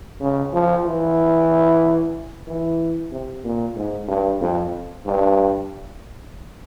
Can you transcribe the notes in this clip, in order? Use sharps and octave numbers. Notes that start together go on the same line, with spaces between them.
C#3
F3
E3
E3
C3
A#2
G#2
G2
F2
G2